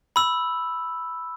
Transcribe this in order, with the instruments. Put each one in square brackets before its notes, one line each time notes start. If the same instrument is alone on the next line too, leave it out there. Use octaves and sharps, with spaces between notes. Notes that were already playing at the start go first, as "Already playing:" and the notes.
[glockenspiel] B5 E6